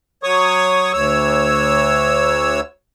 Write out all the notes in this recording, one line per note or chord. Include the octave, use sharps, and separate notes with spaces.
F#3 C#5 C#6 D#6
D2 C#5 E6